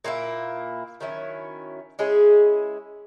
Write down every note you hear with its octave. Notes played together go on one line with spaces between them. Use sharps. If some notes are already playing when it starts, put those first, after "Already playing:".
A#2 A#3 E4
D#3 F#3 C#4 E4
G#3 C#4 E4 G#4